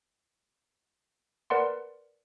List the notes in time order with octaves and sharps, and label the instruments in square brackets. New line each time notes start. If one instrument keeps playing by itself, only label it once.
[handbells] A#4 B4 D5 F#5 C6